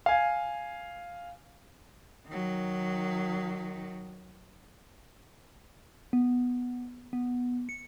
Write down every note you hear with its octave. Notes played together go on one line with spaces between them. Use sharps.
F5 G#5
D#3 F#3
B3
B3
C#7